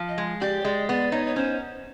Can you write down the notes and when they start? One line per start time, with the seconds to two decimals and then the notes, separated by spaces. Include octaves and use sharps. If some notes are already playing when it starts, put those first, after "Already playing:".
Already playing: F3
0.09 D#5
0.18 G#3
0.41 G4 D5
0.61 C#5
0.65 G#3 D5
0.88 B3 D5
1.12 D#4 C#5
1.26 C#5
1.36 C#4 C5